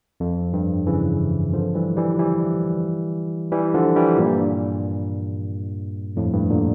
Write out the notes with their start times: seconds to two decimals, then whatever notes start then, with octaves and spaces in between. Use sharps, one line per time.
0.20 F2
0.53 G2
0.87 C#3 E3
1.53 D3 F3
1.75 E3 G3
1.97 E3 G3
2.14 F3
2.19 E3 G3
3.52 E3 G3
3.74 D3 F3
3.96 E3 G3
4.18 G2 A#2
6.16 F2 A2
6.33 G2
6.50 A#2 D3